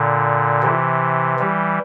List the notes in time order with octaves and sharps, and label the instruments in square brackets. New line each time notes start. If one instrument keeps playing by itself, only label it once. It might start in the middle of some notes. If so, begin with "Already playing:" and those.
Already playing: [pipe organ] A#2 D3
C3 E3
E3 G3